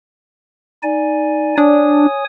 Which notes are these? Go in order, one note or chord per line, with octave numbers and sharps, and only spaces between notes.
D#4 D5 G#5
D4 C#5 G#5 D#6